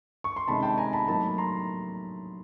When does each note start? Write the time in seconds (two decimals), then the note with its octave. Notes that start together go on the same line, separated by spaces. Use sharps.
0.24 C#6
0.36 C6
0.48 C3 D#3 G#3 C#4 A5 B5
0.63 G5 A5
0.78 G#5 A#5
0.93 A5 B5
1.08 A2 F#3 A#3 D#4 A5 B5
1.38 A#5 C6